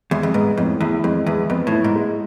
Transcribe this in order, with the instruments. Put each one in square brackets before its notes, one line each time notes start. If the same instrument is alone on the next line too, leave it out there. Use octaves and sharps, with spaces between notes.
[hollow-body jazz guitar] E2 [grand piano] G#3
[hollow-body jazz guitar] F2
[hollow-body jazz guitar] G#2 [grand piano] B3
[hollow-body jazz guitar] F2 [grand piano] A2
[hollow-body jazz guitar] E2 [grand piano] E4
[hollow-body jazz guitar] F2 [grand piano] G#3
[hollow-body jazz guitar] E2 [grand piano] B3
[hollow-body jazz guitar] F2 [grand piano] B3
[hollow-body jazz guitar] A2
[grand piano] E4
[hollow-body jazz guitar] G#2
[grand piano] G#3